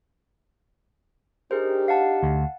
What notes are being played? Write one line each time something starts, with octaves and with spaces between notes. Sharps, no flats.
D4 D#4 G4 G#4 A#4 C5
F5 F#5 A5
D2